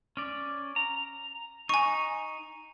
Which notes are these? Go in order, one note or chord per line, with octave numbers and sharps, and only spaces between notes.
C#4 D5
A#5
D#4 G#5 C#6